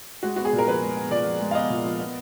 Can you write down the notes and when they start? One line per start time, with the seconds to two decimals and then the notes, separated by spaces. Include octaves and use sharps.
0.23 G#3 F#4
0.36 B3 F#4
0.45 G#4
0.53 A#2
0.58 A#4
0.67 F3 B4
0.83 G#3
0.97 B3
1.11 A#2 D5
1.26 F3
1.40 G#3
1.51 F5
1.55 B3 D#5
1.70 A#2
1.85 F3
2.00 B3